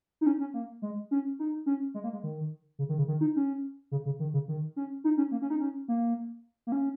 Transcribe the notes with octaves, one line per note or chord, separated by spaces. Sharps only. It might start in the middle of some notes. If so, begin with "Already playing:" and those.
D#4
C#4
C#4
A#3
G#3
C#4
D#4
C#4
G#3
A#3
G#3
D#3
C#3
D#3
C#3
D#3
D#4
C#4
C#3
C#3
D#3
C#3
D#3
C#4
D#4
C#4
A#3
C#4
D#4
C#4
A#3
A#3
C#4